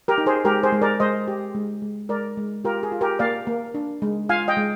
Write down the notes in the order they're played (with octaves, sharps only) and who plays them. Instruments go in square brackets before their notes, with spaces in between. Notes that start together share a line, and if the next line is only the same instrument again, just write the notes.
[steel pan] G4 A#4
D#4
G#4 C5
G#3 G4 A#4
G#4 C5
G#3
A#4 D5
G#3 C5 D#5
G4
G#3
G#3
G#3 A#4 D5
G#3
F4 G4 A#4
G#4
F4
G4 A#4
A#3 D5 F5
A#3
D4
G#3
F4 F5 G#5
D#5 G5
G#3